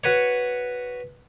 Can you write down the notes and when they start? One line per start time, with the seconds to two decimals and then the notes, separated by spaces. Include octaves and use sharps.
0.04 F#4 B4 C#5